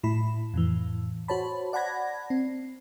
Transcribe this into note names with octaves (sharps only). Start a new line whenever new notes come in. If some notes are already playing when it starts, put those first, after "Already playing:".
A2 E4 B5
F2 A2 E3
F#4 C5 C#5 A5 B5
D5 F#5 A5 B5 G#6 A#6
C4